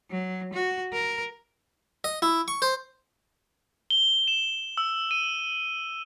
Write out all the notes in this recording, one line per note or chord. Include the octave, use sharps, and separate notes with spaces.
F#3
F#4
A#4
D#5
E4
C#6
C5
G7
E7
E6
D#7